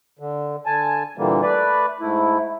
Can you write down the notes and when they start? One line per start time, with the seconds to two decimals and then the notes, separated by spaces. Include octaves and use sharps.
0.19 D3
0.66 D3 G#5 A5
1.17 A#2 D3 E3 G3 A#3
1.42 A3 B4 D5
2.00 G#2 A3 E4